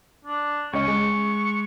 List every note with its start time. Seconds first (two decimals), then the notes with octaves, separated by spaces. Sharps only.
0.24 D4
0.73 C#2 C#4 D#5 C#6
0.88 G#3